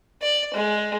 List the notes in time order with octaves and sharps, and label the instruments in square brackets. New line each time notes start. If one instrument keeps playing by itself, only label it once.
[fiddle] D5
G#3